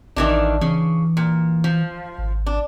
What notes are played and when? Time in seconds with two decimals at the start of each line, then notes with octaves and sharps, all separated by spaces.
0.16 A1 D#3 E3 D4
0.61 C#3 E3
1.17 A#2
1.64 F3
2.18 G#1
2.46 D4